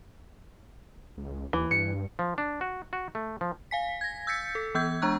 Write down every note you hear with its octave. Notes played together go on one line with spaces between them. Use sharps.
C#2
D#2 E3
G2 C#7
F3
D4
F#4
F#4
A3
F3
F5 G#5 B6
G#6 A#6
E6 G6 A6 B6 C#7
A4
E3 B3 E6 G6 G#6
G#3 D4 A#5 C#6 F#6